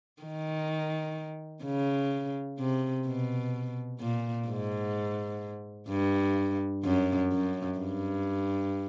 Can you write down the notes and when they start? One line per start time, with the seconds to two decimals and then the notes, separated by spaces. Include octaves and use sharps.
0.22 D#3
1.64 C#3
2.59 C3
3.06 B2
4.00 A#2
4.49 G#2
5.89 G2
6.85 F#2
7.32 F#2
7.78 G2